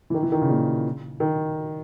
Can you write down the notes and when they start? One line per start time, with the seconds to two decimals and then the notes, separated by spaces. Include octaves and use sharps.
0.10 E3
0.14 D#3
0.23 E3
0.32 D#3
0.41 C#3
0.49 A#2
1.20 D#3